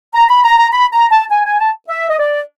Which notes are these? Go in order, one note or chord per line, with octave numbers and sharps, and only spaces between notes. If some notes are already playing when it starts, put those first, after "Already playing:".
A#5
B5
A#5
A#5
B5
A#5
A5
G#5
G#5
A5
E5
D#5
D5